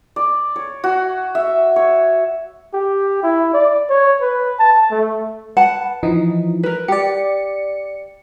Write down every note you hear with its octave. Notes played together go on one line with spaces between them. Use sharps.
D5
C#5
F#4
E5
C#5
G4
E4
D5
C#5
B4
A5
A3
B4 F#5 A5
E3 F3 D#4
A#4 B4
G4 D5 C#7